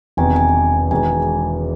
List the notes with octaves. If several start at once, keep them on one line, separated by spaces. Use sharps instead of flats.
E1 E2 C3 D#3 G#5
G#5
E1 E2 D#3 G#3 G#5